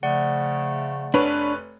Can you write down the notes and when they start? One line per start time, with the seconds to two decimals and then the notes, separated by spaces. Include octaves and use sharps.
0.03 C#3 F3 A3 D5 F#5
1.14 F1 D4 B4 C#5